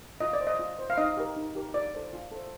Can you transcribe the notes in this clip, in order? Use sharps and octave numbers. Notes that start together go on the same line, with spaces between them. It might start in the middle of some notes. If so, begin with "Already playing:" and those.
F4 D#5
D5
C5
D#5
F4
C5
F5
D#4 D#5
G4 A#4
D#4
G4 A#4
F4 D5
A4 C5
F4
A4 C5